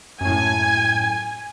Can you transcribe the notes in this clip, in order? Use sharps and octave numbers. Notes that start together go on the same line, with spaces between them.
F#2 A2 G#5